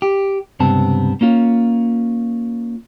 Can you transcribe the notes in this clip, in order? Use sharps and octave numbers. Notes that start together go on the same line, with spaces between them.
G4
C#2 G2 C3 B3 C4 A5
A#3 C#4 F4